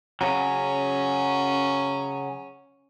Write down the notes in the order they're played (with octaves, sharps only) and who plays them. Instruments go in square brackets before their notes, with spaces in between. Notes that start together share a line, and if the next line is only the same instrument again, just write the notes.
[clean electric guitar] C#3 F#3 [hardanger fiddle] C#4